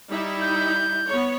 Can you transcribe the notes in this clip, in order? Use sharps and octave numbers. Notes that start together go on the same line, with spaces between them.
G3 D#4 E4
G6
B3 C#5